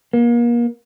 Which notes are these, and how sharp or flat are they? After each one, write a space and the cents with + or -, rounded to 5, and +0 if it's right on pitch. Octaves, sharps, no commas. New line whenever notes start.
A#3 +35